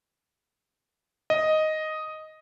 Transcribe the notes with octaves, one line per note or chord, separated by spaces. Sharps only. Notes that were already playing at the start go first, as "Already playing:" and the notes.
D#5